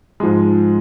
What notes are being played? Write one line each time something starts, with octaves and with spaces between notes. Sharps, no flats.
G#2 F3 G#3